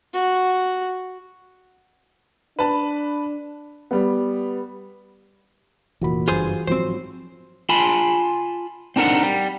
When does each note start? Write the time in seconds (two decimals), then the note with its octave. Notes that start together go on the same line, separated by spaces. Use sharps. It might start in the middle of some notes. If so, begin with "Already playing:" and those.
0.14 F#4
2.59 D4 B4 A5 B5
3.91 G3 B3
6.02 F1 A#2 E3 F#4 B5
6.28 F#1 G2 F4 G#4 C5
6.67 G#2 F3 F#3 C4 C5
7.69 F4 G#5 A5 B5 C6
8.96 C4 D4 D#4 A#4 F#5
9.23 G3